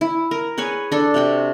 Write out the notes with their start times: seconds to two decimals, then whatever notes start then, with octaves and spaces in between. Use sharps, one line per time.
0.01 E4
0.31 A#4
0.58 G#4 B4 C#5 G#5
0.92 D4 A4
1.14 C3 F#4 G5 C6